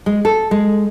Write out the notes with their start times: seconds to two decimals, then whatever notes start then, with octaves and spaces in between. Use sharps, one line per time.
0.06 G#3
0.25 A4
0.51 G#3